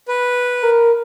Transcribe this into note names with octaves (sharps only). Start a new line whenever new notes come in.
B4
A#4